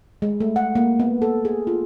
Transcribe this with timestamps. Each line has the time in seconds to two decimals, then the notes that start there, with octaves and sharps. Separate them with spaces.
0.22 G#3
0.40 A3
0.56 F#5
0.75 A#3
1.00 B3
1.22 A4
1.45 G#4
1.67 F4